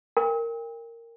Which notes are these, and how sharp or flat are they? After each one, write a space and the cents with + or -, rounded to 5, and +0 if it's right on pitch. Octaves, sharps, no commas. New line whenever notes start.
A#4 -10 G5 +35